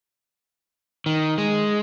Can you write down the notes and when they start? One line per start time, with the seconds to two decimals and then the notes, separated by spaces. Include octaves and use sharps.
1.06 D#3
1.38 G#3